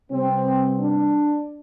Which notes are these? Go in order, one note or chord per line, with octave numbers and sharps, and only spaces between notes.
C3 G3 B3 C4
D4